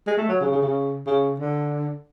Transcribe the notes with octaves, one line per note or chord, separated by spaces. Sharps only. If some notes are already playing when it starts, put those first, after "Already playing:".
G#3
A3
F#3
C#3
C#3
C#3
C#3
D3